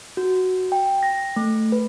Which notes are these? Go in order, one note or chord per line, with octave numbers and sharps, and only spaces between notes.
F#4
G5
A#6
A3
B4